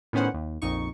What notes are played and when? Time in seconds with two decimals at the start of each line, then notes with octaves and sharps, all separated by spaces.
0.13 A2 D#3 B3 C#4 C5 F#5
0.34 D#2
0.62 A#1 F2 D#4 C#6